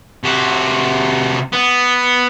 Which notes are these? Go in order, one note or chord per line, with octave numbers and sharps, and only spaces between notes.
C3 F#4
B3